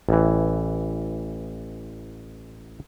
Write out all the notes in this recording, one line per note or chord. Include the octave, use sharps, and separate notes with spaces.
A1 E3